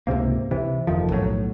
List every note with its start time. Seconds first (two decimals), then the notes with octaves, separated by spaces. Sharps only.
0.07 C#2 G#2 C3 A#3
0.51 C3 E3
0.87 F#1 F2 D#3 F3
1.10 B1 A2 F#3